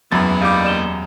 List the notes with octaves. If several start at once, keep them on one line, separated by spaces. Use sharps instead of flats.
E1 F#2 E3 A#3 B5 A6
E3 G3 D#4 F5 D6
D5 E7 G7